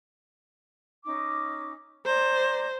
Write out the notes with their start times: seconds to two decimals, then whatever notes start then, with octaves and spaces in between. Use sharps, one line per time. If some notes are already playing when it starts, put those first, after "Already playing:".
1.04 C#4 D#4 D6
2.06 C5 D5 A#5